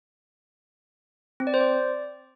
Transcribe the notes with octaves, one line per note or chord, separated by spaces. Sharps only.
C4
D5
C5
D5